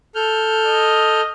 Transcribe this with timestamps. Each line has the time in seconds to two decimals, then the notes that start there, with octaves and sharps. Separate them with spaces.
0.15 A4 F6 G6
0.67 D#5